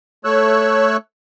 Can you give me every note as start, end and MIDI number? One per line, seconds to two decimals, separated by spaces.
0.25 0.97 57
0.25 0.97 73
0.25 0.97 88
0.25 0.97 90